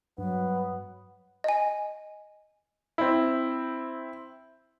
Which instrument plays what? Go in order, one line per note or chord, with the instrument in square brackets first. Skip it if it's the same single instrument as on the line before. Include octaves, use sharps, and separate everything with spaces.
[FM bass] G2 [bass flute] F#3 [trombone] B3
[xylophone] D#5 G#5
[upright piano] C4 E4